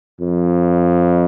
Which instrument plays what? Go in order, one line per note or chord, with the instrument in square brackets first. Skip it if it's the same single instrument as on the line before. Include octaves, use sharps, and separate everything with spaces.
[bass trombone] F2